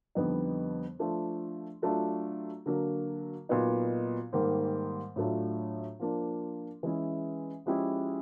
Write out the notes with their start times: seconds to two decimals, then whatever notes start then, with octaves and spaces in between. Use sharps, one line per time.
0.15 F2 D3 G3 B3 D#4
0.99 F3 A3 D4
1.82 F#3 A3 D4 F4
2.66 D3 F#3 A#3
3.49 A#2 F#3 B3 D#4
4.33 G#2 D#3 G3 A#3
5.16 A2 F#3 A3 D4 F4
6.00 F3 A#3 D4
6.83 E3 G#3 C#4 E4
7.66 F3 G#3 C#4 E4 G4